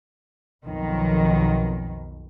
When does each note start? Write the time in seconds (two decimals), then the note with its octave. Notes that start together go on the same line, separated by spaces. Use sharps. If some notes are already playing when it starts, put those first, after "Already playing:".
0.66 B1 F2 B2 D#3